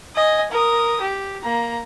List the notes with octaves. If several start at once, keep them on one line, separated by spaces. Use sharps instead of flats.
D#5 G#5
A#4 D#6
G4
A#3 A#5